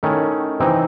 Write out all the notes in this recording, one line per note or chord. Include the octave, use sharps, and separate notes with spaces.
D#3 A3 C#4 E4
C3 E3 C4 D#4